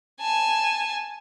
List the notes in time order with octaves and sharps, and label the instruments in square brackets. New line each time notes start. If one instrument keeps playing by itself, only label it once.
[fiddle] G#5 A5